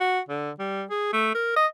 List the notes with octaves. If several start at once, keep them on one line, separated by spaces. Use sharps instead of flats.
F#4
D3
G3
G#4
A3
A#4
D#5